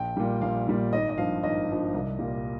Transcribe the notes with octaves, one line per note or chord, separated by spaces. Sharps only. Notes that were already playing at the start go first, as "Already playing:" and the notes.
Already playing: A#1 G5
A#2 G3
A#1 F5
A#2 G3
G#1 D#5
D#5
G2 F3 F5
G#1 D#5
G2 F3
C2
A#2 G3